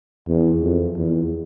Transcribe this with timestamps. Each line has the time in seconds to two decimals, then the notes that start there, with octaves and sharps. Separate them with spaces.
0.28 E2
0.62 F2
0.96 E2